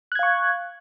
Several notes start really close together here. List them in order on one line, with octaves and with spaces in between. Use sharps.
F#6 G#6 F5 C#6